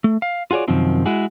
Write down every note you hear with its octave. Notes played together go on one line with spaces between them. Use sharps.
A3
F5
F4 F#4 G#4 C#5 D5
F#2 C3 D#3 F3 C4
G#3 E4 F#4 G#4